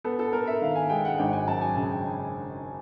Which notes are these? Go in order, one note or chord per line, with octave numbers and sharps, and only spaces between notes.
B3 A4
A4
B3 A#4
E5
D#3 F5
G#5
G#3 G5
F#5
G#1 G5
G#5
F#2 A5
G#5
C#3 G#5
G5